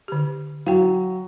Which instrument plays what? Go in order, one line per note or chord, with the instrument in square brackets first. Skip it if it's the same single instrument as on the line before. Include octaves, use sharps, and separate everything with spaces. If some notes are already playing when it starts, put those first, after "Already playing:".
[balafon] D3 G4
[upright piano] F#3 [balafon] F5 G5